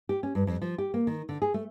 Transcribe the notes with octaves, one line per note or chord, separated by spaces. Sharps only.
G4
C#4
G2
F2
F3
G4
A#3
D#3
D3
G#4
A3